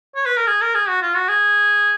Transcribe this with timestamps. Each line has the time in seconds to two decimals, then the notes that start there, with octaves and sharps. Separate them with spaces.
0.16 C#5
0.26 B4
0.37 A#4
0.47 G#4
0.61 A#4
0.75 G#4
0.88 F#4
1.02 F4
1.15 F#4
1.29 G#4